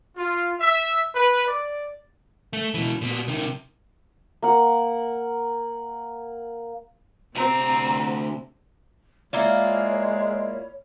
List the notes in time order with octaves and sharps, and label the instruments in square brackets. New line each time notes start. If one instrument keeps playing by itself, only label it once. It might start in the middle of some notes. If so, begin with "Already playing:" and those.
[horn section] F4
E5
B4
D5
[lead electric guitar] A3
B2 E3
A#2 B3
C3 D#3
[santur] A#3 F#5
[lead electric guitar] D2 A#5 [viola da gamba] C3 C4
[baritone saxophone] G#3 [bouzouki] A#3 E4 F4 [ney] C#5 [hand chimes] D5 E5